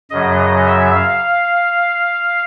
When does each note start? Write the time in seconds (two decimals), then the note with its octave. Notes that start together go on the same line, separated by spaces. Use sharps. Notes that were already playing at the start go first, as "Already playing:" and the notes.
0.10 F#2 C#3 F#3 D#5
0.67 E5
0.95 F5